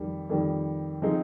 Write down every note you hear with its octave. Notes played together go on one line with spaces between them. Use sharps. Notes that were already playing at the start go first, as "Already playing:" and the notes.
Already playing: F2 D#3 G3
F2 D#3 G3
F3 C4 D#4 G#4